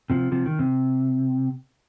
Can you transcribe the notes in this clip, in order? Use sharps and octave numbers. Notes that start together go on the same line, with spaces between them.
C3 F3
C3 F3
D#3
C3